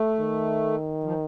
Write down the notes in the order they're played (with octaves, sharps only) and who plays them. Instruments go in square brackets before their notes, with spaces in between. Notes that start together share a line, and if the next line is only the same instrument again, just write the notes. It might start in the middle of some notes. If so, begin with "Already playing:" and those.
Already playing: [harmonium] A3
[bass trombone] D#3
[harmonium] F3